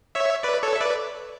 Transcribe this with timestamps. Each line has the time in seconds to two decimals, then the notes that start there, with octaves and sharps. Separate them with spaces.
0.15 C#5 E5
0.43 B4 D5
0.63 A4 C#5
0.76 E5
0.80 B4 D5